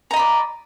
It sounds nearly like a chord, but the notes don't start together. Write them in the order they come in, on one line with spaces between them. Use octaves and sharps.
A#5 D#5 B5 D5